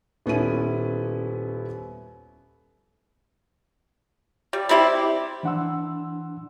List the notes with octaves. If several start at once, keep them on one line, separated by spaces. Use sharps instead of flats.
D#1 B3 C#4 E4 D#7
G3
G3 C4 E4 G4
E3 D4 F#5 C6 E6